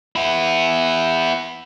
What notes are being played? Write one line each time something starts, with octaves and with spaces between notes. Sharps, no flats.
B3 E4